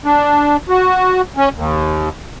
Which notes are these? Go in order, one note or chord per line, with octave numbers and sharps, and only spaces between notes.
D4
F#4
C#4
D#2